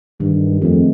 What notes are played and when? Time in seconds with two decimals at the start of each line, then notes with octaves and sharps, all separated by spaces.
0.20 G2 D#3 E3 G#3
0.62 F2 G#3 A3